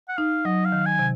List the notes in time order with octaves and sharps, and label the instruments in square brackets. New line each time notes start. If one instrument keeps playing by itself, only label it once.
[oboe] F#5
[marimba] D#4 [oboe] F5
[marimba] F#3 [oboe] D#5
[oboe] F5
[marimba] D#3
[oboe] G#5
[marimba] C3